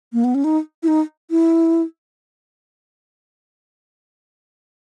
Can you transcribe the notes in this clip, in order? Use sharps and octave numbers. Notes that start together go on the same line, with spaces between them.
A#3
B3
C#4
D#4
E4
D#4
E4